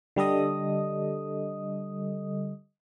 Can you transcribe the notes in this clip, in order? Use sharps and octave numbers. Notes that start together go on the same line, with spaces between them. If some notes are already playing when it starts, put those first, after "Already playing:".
D3 G3 A4 D#5 D#6